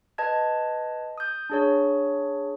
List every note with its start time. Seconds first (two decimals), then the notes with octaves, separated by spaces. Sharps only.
0.18 B4 D#5 A5 G#6
1.18 D#6 G6
1.50 D4 G#4 C#5